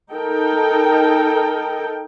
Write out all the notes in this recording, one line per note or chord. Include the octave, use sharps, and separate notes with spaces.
D#4 A4 A#4 G5